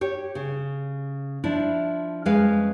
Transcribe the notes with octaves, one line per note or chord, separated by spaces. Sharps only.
G4 C#5
C#3
F3 D4 E4
F2 G#3 C#4 B4 F5